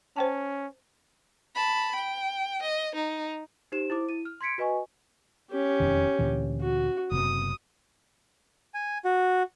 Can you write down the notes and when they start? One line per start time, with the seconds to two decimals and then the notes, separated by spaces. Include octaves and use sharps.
0.16 C#4 C5 G5 A5
1.55 A5 B5
1.95 G5
2.62 D#5
2.95 D#4
3.72 D#4 G4 C5 E7
3.90 E4 C5 D6
4.09 E4 D#7
4.25 F6
4.41 C6 G#6 B6 C#7 D7
4.58 F#4 B4 D#5 G#5 C#6
5.51 C#4 G4
5.80 E1 F2 D#3
6.19 D2 A#2 E3
6.61 F#4
7.12 F#1 C3 D#6
8.74 G#5
9.05 F#4